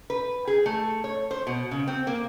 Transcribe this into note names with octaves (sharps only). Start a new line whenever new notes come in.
B4
G#4
A3
C#5
C5
B2
C#3
C4
A#3